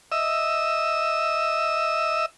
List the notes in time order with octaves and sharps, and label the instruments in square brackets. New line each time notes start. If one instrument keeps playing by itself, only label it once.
[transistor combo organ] D#5 E5 E6